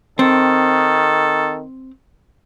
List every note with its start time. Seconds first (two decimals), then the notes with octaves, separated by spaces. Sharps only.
0.19 D#3 C4 A4